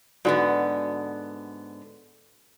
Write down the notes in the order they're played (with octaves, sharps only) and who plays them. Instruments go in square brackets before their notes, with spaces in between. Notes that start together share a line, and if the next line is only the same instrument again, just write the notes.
[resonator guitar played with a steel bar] G#2 D3 B3 [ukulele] F#4 D5